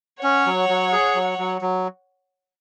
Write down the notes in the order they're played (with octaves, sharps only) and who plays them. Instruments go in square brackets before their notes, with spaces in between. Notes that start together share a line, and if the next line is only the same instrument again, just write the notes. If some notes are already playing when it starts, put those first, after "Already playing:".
[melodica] C#4 [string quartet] C#5 F#5
[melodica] F#3
F#3
G#4
F#3
F#3
F#3